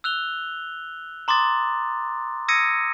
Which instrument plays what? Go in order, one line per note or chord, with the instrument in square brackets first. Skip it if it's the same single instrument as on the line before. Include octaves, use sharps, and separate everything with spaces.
[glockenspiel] E6 F#6 F7 G7
A#5 C6 D6 D#6 A6
D#6 E6 G#6 A#6 C#7 D#7